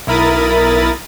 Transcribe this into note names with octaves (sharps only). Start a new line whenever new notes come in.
B1 E4 A#4 B5 D#6 A6